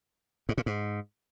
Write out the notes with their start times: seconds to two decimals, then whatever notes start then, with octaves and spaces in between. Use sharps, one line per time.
0.49 G#2
0.58 A#2
0.66 G#2